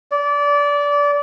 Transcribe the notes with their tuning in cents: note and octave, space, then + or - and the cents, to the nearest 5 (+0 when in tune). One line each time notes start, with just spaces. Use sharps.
D5 -25